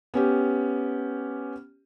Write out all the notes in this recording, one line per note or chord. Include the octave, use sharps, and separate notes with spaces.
B3 C#4 G4